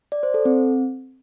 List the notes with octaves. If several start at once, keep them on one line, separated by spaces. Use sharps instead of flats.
D5
C5
A4
C4